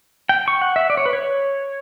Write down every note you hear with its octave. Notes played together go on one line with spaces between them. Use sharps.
G5
C#6
F#5
E5
D5
C#5
B4
C#5